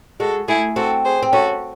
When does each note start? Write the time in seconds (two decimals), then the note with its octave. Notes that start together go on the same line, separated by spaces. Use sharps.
0.19 G#3 F#4 A4
0.48 A3 E4 G#4
0.76 C4 F#4 A4
1.05 G#4 C5
1.23 C4
1.32 C#4 F#4 A4